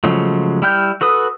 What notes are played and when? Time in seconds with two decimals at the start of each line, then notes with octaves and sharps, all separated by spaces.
0.04 C#3 F3 F#3 G#3 A3
0.62 G3 E4 G5 F6 G6
1.01 F#4 A4 B4 D#6